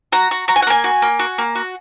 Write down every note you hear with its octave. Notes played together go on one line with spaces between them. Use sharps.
F#4 A#5
F#4
F#4 A#5
G#5
F#5
A#3 G#5
F#4
A#3
F#4
A#3
F#4